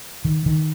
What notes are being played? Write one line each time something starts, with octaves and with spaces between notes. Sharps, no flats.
D#3
D#3